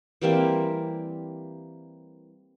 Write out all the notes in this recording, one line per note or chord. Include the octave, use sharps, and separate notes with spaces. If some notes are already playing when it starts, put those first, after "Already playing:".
E3 G3 A#3 C4